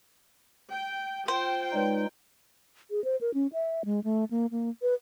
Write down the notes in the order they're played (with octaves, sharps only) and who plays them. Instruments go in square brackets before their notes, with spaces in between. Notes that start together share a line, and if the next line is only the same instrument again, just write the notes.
[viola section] G5
[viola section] F4 G5 [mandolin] C5
[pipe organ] G#3 D#4 [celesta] B4 C#5 D5
[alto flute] G#4
C5
A#4
C#4
E5
G#3
A3
A#3
A#3
B4